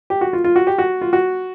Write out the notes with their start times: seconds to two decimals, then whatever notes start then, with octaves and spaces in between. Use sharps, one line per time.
0.10 G4
0.21 F#4
0.33 F4
0.44 F4
0.56 F#4
0.67 G4
0.78 F#4
1.02 F4
1.13 F#4